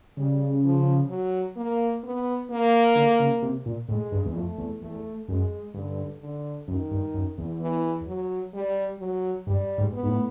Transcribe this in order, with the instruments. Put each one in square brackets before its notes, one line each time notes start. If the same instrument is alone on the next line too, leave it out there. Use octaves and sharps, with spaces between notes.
[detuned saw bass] C#3 [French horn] G3
[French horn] F3
F#3
A#3
B3
A#3
[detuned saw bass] D3
C#3
C3
A#2
[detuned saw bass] A2 [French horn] G#3
[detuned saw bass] G2
E2
[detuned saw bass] F2 [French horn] A3
[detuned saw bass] E2
[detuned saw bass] E2 [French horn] A3
[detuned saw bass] F#2 [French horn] G#3
[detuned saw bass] G2 [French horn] D3
[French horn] D3
[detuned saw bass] F#2 [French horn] D#3
[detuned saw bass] G2
F#2
E2
[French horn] E3
F#3
G3
F#3
[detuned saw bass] G2 [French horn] G3
[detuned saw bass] G#2
[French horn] B3
[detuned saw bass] G#2
A2